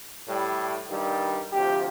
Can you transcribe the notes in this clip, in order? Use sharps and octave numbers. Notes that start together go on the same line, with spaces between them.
A2 G3
G2 D#3 G3
D2 C3 F3 G4